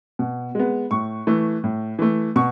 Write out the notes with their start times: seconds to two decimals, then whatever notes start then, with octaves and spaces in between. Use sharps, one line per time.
0.19 B2
0.55 G#3 B3
0.91 A2 C#6
1.27 E3 A3
1.64 A2
1.99 E3 A3
2.36 B2 C#6